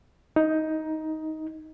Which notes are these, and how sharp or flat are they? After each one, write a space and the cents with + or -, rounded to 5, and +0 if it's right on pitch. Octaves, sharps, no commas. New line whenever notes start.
D#4 +15